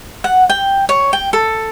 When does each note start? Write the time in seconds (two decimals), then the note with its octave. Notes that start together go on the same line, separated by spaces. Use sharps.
0.24 F#5
0.50 G5
0.89 C#5
1.13 G5
1.33 A4